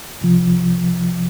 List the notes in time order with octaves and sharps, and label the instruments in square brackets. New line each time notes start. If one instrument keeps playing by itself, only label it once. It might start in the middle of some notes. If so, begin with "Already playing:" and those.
[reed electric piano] C2 C3 F3